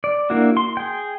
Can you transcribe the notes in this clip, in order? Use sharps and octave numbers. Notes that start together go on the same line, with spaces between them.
D5
A#3 D4 E4 F#4
C6
G#4 G5